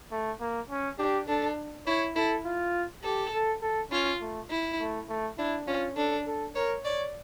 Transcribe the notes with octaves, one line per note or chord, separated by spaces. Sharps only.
A3
A#3
C#4
D4 G4
D4 A4
E4 C#5
E4 A4
F4
G4 A4
A4
A4
C#4 F4
A3
E4
A3
A3
D4 E4
C#4 F4
D4 A4
A4
A#4 C#5
C#5 D5